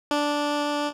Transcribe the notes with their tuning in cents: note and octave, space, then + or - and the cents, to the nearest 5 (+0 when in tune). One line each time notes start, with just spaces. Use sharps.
D4 -5